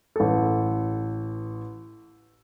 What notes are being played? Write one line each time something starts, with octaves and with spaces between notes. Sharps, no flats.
A1 A4